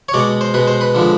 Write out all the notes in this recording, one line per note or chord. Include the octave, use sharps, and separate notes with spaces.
C#5
B2 G#3 D5
C5
B2 G#3 B4
C5
B4
D3 F3 G#3